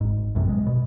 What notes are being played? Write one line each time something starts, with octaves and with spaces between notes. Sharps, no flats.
G#1 G#2
A1 F#2 C3
G#3
B2